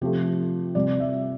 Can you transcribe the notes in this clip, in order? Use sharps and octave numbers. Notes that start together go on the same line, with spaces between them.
C3 F3 A3 G4
C3 G3 D5
E5